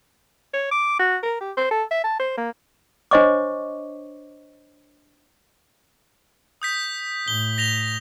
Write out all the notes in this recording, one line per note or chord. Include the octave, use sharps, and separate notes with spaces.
C#5
D6
F#4
A#4
G4
C5
A4
E5
A5
C5
A#3
D4 C5 C#5 D#5 C#6 D6
D#6 G6 B6
A2 G7
A#6 F7 G7